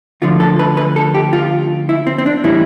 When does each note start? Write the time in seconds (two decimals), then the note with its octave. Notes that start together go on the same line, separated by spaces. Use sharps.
0.22 D2 D3 F3 F4
0.40 A4
0.59 B4
0.77 B4
0.96 A4
1.14 G4
1.33 F4
1.89 E4
2.07 C4
2.18 C4
2.26 D4
2.44 A2 E3 G3 E4